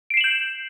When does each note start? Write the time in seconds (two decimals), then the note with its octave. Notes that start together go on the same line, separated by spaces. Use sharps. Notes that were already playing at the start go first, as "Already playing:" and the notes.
0.10 D7
0.14 C7
0.17 E7
0.21 F#7
0.24 G6